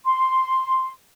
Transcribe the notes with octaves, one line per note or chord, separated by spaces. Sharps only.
C6